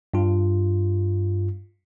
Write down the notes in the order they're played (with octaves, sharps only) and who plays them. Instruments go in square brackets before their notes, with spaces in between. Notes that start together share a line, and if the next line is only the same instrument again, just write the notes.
[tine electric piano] G2 F4